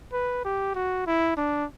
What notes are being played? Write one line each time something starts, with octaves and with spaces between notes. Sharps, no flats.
B4
G4
F#4
E4
D4